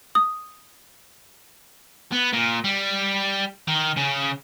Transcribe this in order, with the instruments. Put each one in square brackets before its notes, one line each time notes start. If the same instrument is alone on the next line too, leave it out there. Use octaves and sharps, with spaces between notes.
[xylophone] D#6
[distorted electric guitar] B3
A#2
G3
D#3
C#3